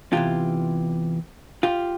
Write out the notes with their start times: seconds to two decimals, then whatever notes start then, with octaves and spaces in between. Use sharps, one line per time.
0.12 E2 C3 E3 F4 G4
1.63 F4 G4